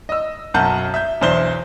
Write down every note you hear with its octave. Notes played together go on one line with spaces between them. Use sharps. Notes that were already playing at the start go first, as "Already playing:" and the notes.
D#5 E6
B1 F#2 F#5 A5 G6
E5 G6
B1 E2 D4 C5 E5 G7